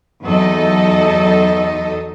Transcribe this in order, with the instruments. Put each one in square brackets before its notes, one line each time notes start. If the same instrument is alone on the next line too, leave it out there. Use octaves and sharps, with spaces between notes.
[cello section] E2 F#3 D#4 A4 D#5